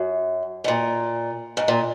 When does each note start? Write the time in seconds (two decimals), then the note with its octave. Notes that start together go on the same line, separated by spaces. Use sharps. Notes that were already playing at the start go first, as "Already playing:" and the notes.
Already playing: F#2
0.64 G#2
0.68 A#2
1.57 G#2
1.68 A#2